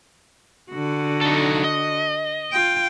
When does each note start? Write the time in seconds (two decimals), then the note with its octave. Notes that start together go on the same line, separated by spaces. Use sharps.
0.72 D3 F#4
1.21 D#4 A4
1.64 D#5
2.53 F4 G5